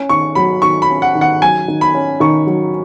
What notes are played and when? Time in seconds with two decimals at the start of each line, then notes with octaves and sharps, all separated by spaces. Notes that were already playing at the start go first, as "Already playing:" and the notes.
Already playing: C#4
0.09 D#3 C#6
0.35 F#3 B5
0.62 D#3 C#6
0.82 B5
0.89 C#4
1.02 F#5
1.15 D#3
1.21 F#5
1.42 F#3 G#5
1.68 D#3
1.81 B5
1.94 C#4
2.20 D#3 C#6
2.47 F#3